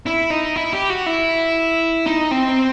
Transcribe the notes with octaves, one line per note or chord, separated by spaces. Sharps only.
E4
D#4
E4
G4
F#4
E4
D#4
C4